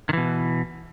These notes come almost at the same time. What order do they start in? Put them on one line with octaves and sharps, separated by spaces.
D#3 E3 B2